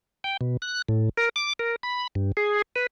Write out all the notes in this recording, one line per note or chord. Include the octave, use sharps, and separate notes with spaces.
G5
B2
F#6
A2
A#4
D6
A#4
B5
G2
G#4
B4